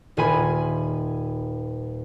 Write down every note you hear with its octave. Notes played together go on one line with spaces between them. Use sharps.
D#1 D#3 F4 G#5 B5 D#7